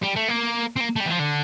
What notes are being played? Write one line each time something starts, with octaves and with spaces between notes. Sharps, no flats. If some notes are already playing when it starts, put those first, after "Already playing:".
G3
A3
A#3
C4
A#3
A3
G3
E3
F3
D3